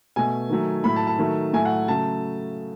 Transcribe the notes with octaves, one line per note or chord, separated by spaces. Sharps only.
B2 A3 G#5
D#3 F#3 A3
A2 F#3 A3 B5
A5
A5
D#3 F#3 A3
A2 F#3 A3 G#5
F#5
C#3 F#3 A3 A5